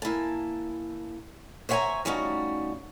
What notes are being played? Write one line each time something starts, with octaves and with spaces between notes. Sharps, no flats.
A#3 E4 G#5 A5
C5 C#5 E5 F#5 G#5 A#5
F3 G3 A3 C#4 D#4 F#4